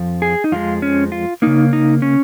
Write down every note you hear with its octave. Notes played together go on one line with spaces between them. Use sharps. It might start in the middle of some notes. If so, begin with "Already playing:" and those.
Already playing: F2 F3
G#4
D#4
F2 F3 G#3 F4
C#4
F4
C#3 A#3 D#4
D#4
C#4